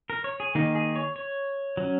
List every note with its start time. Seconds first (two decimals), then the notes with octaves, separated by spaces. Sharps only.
0.10 A#4
0.24 C#5
0.40 G#4
0.55 D#3 A#3 D#4 G#4
0.75 G#4
0.95 C#5
1.16 C#5
1.77 F#3 C#4